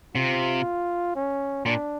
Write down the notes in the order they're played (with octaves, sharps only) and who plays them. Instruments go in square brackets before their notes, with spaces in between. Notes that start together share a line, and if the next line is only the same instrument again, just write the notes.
[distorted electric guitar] C3 [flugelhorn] F4
[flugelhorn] C#4
[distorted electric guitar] A#2 [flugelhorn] D4